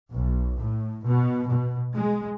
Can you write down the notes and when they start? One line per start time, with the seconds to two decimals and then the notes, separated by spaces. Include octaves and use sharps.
0.12 B1
0.59 A2
1.05 B2
1.49 B2
1.94 G#3